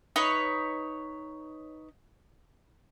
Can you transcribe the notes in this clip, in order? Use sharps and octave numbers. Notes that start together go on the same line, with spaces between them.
D#4 B4 C#5